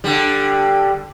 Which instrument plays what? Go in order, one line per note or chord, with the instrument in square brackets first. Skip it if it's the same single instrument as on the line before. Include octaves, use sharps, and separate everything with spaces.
[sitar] D3 G3